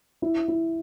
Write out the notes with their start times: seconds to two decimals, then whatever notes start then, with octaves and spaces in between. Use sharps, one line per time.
0.22 E4
0.48 E4